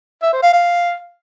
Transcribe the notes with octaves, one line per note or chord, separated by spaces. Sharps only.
E5
C5
F5
F5